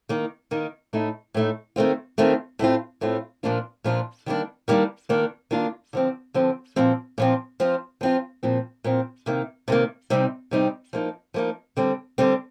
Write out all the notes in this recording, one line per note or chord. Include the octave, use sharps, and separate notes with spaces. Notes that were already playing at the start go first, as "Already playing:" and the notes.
D#3 A#3 D#4
D#3 A#3 D#4
A2 A3 D#4
A2 A3 D#4
D#3 A3 C4 F4
D#3 A3 C4 F4
A2 A3 C4 F4
A2 A3 C4 F4
A#2 F3 A#3 D4 F4
A#2 F3 A#3 D4 F4
D#3 G3 A#3 D4
D#3 G3 A#3 D4
D#3 A#3 D4 F4
D#3 A#3 D4 F4
D3 F3 C4
D3 F3 C4
A#2 F3 C4
A#2 F3 C4
F3 C4 F4
F3 C4 F4
A#2 F3 C4
A#2 F3 C4
C3 D#3 A#3
C3 D#3 A#3
C3 G3 C4 D#4
C3 G3 C4 D#4
F3 A#3 D#4
F3 A#3 D#4
D3 G3 C4
D3 G3 C4